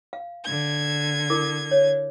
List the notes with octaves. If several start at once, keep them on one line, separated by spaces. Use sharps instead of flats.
F5
D3 G#6
E4 A#4 D6
C#5